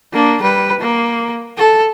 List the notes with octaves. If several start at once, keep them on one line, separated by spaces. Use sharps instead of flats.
A#3 D4
G3 B4
A#3
A4